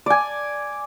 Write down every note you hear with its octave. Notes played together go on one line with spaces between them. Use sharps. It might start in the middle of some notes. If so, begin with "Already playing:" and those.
D5 G#5